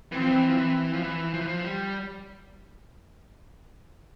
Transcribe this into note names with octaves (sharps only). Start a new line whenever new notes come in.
E3 C4
F3
E3
F3
E3
F3
E3
F3
E3
F3
G3